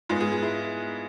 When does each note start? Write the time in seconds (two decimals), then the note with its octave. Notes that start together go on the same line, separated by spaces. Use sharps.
0.09 G#2 G#3 B3 F4
0.20 G#4
0.32 G#4
0.42 E4